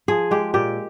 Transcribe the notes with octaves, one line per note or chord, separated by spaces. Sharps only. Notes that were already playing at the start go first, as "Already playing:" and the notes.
F3 G#4
G#3 G4
A#2 G4